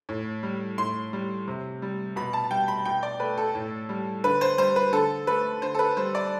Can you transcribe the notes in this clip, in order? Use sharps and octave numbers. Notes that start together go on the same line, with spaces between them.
A2
G3
A2 C6
G3
C3
G3
B2 B5
A5
G3 G5
B5
B2 G5
D5
A3 B4
A4
A2
G3
D3 B4
C5
G3 C5
B4
D3 A4
A3 B4
D3 C5
A4
B4
G3 C5
D5